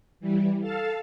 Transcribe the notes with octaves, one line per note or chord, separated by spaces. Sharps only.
E3 G3
A4 F5 A5